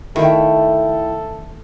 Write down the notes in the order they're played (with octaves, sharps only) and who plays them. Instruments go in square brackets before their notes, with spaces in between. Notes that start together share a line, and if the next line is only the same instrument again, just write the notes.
[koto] D#3 [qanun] A3 [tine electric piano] E4 F5 G5 [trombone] A4